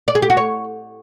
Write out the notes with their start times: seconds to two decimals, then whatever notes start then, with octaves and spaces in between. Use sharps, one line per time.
0.08 D5
0.15 G#4
0.22 G4
0.30 F#4
0.37 C#5